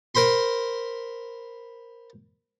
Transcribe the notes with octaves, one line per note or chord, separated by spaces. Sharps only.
A#4 C5 B5 C6